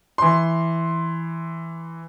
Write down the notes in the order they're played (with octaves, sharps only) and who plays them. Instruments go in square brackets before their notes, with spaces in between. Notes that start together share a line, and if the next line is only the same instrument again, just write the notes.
[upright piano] E3 C6